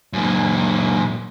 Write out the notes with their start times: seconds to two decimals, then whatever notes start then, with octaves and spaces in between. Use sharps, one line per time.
0.13 F#2 A#2